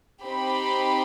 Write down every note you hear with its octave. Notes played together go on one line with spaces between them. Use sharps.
C4 D#4 G4 B5